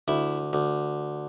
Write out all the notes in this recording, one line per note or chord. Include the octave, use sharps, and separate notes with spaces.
D2 E4
D2